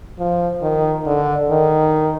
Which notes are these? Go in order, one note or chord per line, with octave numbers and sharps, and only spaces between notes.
F3
D#3
D3
D#3